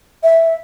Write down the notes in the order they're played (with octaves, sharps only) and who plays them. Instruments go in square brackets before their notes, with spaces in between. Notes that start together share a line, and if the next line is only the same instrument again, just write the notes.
[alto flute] E5